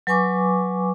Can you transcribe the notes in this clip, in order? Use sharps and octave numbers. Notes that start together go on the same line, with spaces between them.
F#3 B4 G#5 C#6 D6